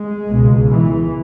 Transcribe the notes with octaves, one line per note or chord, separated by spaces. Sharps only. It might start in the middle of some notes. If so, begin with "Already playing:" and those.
Already playing: G#3
C#2 B2
E3